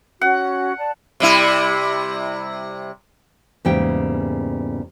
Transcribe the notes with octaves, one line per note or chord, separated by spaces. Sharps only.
C#4 F#4 F#5
D5 A5
C3 G3 E4
E2 G#2 C#3 G3 A#3 G5